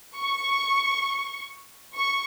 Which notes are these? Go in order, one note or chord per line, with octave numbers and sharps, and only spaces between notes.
C#6
C#6